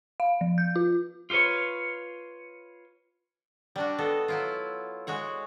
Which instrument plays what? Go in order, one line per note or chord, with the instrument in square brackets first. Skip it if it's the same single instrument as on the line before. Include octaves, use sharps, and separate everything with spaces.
[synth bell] F5
F3
G6
F4
[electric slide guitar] F4 G4 A4 B4 C#5
[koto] G3 D4 F#4
B3 A4 D#5
F#3 E4 F4
G#3 F#4 C#5 F#5